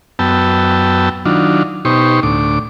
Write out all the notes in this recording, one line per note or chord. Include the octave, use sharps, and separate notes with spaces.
F#2 B3 G5 A5 E6
D#3 F#3 D4 F4
B2 D#4 G4 C5 C#6
D2 A2 D6